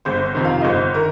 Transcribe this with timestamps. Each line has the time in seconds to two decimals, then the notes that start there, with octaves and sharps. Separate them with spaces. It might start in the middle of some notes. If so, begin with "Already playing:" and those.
0.05 G1 C5
0.25 C5
0.35 F2 C3 D#3
0.45 F5
0.61 D#5
0.65 G1 C5
0.94 D#3 A#4